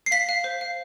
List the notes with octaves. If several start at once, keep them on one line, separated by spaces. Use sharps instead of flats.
C7
F5 B6
F5
C5
F5